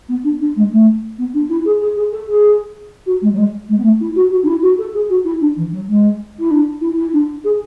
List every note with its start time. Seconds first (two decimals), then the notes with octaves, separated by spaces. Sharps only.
0.09 B3
0.24 D4
0.40 D4
0.56 G#3
0.71 A3
1.18 B3
1.34 D4
1.49 E4
1.65 G#4
1.81 G#4
1.96 G#4
2.12 A4
2.28 G#4
3.06 F#4
3.21 G#3
3.32 F#3
3.37 G#3
3.69 G#3
3.78 B3
3.84 A3
4.00 E4
4.16 F#4
4.31 F#4
4.43 D4
4.47 E4
4.62 F#4
4.78 A4
4.94 G#4
5.09 F#4
5.24 E4
5.41 D4
5.56 E3
5.72 F#3
5.88 G#3
6.39 E4
6.51 D4
6.81 E4
6.97 E4
7.13 D4
7.44 G#4